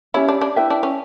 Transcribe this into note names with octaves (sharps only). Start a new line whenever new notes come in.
C#4 E4 G4 C#5 E5
D4
D4
E4 B4 E5 G5
D4
C#4